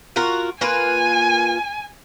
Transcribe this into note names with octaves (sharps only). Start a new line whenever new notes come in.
F4 F#4 A#4
A#3 F4 B4 G#5